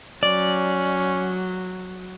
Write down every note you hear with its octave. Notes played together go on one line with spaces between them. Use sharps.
F#3 C#4 D5